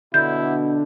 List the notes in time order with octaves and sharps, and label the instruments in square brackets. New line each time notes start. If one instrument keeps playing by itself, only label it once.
[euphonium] B2 [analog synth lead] D3 [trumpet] E4 [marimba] G6